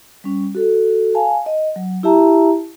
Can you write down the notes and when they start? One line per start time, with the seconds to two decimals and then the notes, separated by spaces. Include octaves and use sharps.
0.24 G3 C#4
0.55 F#4 A4
1.15 F5 G#5 A5
1.46 D#5
1.76 F#3
2.03 E4 G4 E5 A5 A#5